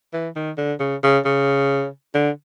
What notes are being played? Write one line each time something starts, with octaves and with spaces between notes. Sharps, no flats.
E3
D#3
D3
C#3
C#3
C#3
D3